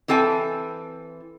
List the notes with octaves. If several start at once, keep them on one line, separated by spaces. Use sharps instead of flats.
E3 C4 A4 G5 G#5